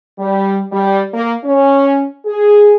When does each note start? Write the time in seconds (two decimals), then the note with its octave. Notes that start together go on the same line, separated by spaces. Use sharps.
0.19 G3
0.72 G3
1.14 A#3
1.44 C#4
2.26 G#4